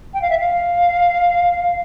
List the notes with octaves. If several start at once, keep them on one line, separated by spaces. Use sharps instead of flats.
G5
F5
E5
F5